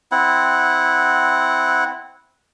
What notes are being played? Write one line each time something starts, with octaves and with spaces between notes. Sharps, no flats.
C4 E4 F#5